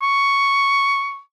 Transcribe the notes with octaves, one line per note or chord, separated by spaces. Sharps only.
C#6